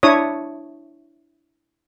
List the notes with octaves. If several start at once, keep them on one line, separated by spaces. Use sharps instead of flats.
D4 E4 C#5 D#6